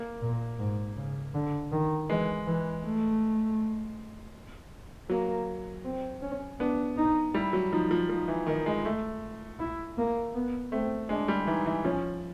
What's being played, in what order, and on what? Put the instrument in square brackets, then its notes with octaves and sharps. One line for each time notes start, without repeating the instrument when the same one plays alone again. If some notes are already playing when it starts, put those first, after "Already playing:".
Already playing: [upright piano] A#3
[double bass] A#2
G#2
C#3
D3
D#3
[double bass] E3 [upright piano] G#3
[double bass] E3
A3
[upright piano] F#3 [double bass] A#3
[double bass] C4
C#4
[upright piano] B3 [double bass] D4
[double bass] D#4
[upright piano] G3 [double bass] E4
[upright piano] F#3
[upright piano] F3 [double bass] D#4
[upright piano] F3
[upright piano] F3 [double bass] D#4
[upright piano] E3
D#3
G#3
A3
[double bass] E4
A#3
B3
[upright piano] A3 [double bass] C4
[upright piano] G#3 [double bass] D4
[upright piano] G3
[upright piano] E3 [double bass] D#4
[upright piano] E3
[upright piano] F3 [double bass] C#4